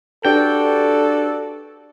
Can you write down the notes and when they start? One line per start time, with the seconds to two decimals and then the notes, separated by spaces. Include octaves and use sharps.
0.25 D4 F#4 G4 A4 B4 D5 G5